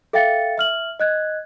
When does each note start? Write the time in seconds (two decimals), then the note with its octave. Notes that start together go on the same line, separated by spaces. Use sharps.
0.13 A4 E5 F5 G5 A6 C#7
0.58 E5 F6 F#7
1.00 D#5 F#6 G#6